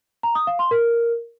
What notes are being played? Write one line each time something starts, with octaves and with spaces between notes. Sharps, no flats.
A#5
D#6
F5
C6
A#4